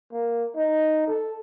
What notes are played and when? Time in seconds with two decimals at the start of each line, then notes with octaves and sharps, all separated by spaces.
0.12 A#3
0.56 D#4
1.08 A4